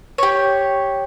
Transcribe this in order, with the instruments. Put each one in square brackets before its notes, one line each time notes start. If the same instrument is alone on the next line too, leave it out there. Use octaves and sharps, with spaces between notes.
[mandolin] G4 C#5